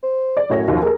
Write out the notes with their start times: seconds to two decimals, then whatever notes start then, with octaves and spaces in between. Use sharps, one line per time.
0.03 C5
0.37 D5
0.50 F#2 A2 C#5 A#6
0.68 D#2 F3
0.82 A#3 G#4 A#4